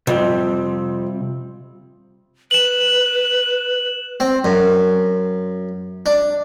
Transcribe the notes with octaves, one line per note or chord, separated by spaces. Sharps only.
F2 C3 G3 C4
B4 E7 F#7
C4
F#2
D4